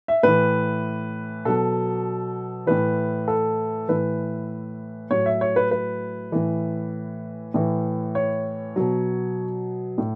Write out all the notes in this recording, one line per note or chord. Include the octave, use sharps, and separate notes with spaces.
E5
A2 E3 B4
B2 F#3 A4
A2 E3 B4
A4
A2 E3 B4
A2 F#3 C#5
E5
C#5
B4
B4
A2 E3
A2 E3
C#5
B2 F#3
A2